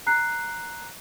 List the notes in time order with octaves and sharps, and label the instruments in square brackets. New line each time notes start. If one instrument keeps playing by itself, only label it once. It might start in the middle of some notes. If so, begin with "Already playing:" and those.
[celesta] A#5 F#6 C7